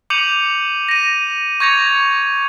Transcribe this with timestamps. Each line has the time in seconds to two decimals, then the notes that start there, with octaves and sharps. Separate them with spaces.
0.10 D6 G6 C#7 D#7 F7 F#7
0.89 A#6 D#7
1.60 C#6 G6 G#6 A#6 C#7 F7
1.86 G#6